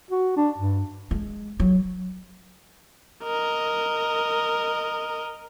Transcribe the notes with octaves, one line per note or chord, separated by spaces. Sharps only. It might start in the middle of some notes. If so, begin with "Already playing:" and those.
F#4
D4
G2
G#3
F#3
A#4 D#5